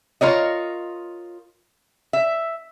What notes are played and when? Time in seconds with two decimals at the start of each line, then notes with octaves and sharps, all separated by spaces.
0.21 F4 A#4 C#5 D#5
2.13 E5